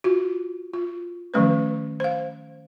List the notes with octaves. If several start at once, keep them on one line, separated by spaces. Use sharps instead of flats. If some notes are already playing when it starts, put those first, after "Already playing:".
F4 F#4
F4
D#3 F3 F#3 A3 C#4 B4
C5 F5